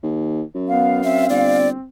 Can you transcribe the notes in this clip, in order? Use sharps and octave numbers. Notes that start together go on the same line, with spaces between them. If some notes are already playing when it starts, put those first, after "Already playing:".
D#2
F#2
B3 F5
C4 E5
G1 D5